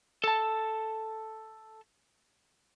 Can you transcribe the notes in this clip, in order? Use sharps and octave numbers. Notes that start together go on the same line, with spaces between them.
A4 A5